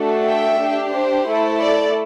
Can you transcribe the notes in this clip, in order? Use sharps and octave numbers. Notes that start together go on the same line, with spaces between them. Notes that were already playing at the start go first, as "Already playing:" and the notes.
Already playing: A3 D4 F#4 A4
E5 G5
D4 G4
C5
A3 E4 A4
D5